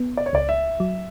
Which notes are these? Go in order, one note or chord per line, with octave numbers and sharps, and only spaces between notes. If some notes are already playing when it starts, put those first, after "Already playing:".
Already playing: B3
D5
C#5
C#2 D5
E5
F#3